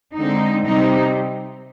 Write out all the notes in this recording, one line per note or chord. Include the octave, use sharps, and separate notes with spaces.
D3 G#3 C4 D#4
C3 G3 C4 D#4